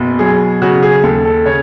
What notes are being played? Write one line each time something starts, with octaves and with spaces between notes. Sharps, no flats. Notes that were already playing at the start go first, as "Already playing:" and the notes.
Already playing: F#1 B2
F#3 G#4
C#3 F#4
G#4
D#2 A4
A4
C#3 C#5